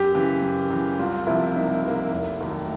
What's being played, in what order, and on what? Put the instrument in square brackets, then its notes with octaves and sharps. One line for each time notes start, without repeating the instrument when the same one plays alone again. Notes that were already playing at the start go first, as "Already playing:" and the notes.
Already playing: [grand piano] F#2 [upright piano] G4
[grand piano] C#3 E3
F#2
C#3 E3
[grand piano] C2 [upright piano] F4
[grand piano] C3 F3 A#3 [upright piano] E4
[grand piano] C2 [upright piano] D#4
[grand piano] C3 F3 A#3
F1
D#2 D#3 F#3 A3